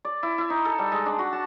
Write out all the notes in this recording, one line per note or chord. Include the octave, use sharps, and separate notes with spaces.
D5
E4
E4
D#4
A4
G3
G#3
D4
F#4
A5